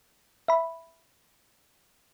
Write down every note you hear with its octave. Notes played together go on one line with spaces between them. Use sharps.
E5 B5